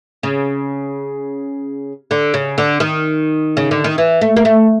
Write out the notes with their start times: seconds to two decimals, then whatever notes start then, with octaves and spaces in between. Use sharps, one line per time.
0.23 C#3
2.11 D3
2.34 C#3
2.58 D3
2.80 D#3
3.57 C#3
3.71 D3
3.84 D#3
3.98 E3
4.21 A3
4.36 A#3
4.45 A3